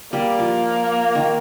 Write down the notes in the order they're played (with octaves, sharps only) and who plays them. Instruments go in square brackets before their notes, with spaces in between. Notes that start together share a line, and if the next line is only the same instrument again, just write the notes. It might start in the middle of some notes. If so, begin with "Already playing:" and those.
[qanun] G3 [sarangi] A#3
[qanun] F3
D#3